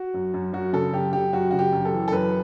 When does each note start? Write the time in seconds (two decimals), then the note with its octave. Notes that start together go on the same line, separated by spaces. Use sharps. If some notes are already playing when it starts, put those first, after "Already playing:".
Already playing: F#4
0.14 F#2
0.34 F#2
0.53 F#2 F#4
0.73 C#3 A4
0.93 F#2 G4
1.13 F#2 G4
1.33 F#2 F#4
1.51 C#3 F#4
1.59 G4
1.72 F#2
1.85 A4
1.93 E3
2.08 A4
2.12 F#2 B4